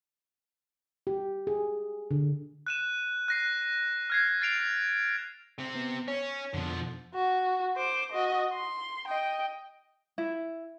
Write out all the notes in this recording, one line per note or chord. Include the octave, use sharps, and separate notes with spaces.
G4
G#4
D3
F#6 D#7 E7
F#6 A#6 C7
F6 G#6 C7
A6 C7 D7 F7
C3 C4
B3
C#4 C#5
F2 B2 D3 F3
F#4
C5 D6
F#4 D#5
C6
D#5 G5
E4